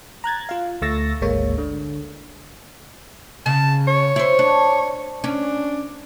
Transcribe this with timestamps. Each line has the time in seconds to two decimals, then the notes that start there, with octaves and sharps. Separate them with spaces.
0.24 A#5 F#6 G#6 A6
0.49 F4 F5
0.82 D2 A3 C#6 E6 A6 A#6
1.21 G#1 D2 G#3 A#3 C#5
1.58 D3
3.46 C#3 A5
3.88 C#5
4.16 E4 C5
4.39 D4
5.24 C#4 D4